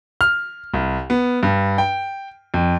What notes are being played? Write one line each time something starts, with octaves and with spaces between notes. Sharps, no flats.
F6
C2
B3
G2
G5
F2